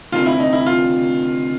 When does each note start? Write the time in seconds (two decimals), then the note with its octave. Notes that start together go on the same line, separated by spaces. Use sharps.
0.12 D2 C3 D#3 F4
0.26 E4
0.39 D#4
0.53 E4
0.66 F4